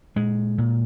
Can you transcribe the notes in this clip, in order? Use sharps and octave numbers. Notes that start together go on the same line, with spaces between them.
A#2 G#3
A#2